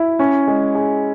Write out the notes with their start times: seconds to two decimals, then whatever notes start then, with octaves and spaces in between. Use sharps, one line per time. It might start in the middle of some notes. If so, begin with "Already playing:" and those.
Already playing: E4
0.19 C#4
0.47 G#3
0.75 G#4